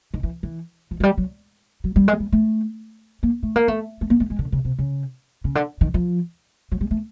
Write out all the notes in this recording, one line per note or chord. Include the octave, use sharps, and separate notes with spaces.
D#3
E3
E3
F3
F#3
G3
F#3
F#3
G3
G#3
G3
A3
A#3
A3
A#3
A3
A3
A#3
A3
G#3
D3
C#3
C3
C#3
C#3
D3
D#3
F3
F#3
G3
A3